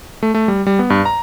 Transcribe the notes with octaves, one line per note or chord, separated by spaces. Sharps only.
A3
A3
G3
G3
B3
G2
A#5